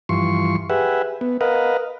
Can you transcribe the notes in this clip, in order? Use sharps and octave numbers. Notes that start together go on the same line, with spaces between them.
G2 E3 F3 C6 C#6
G4 G#4 B4 E5 F#5
B3
A#4 B4 D#5 F5 F#5